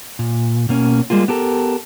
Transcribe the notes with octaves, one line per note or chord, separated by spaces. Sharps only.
A#2
B2 A#3 C#4
G3 G#3 A#3 F4
B3 G4 A4 A#4